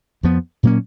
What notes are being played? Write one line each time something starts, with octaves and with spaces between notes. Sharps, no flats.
F2 F3 B3
A#2 F#3 A#3 C#4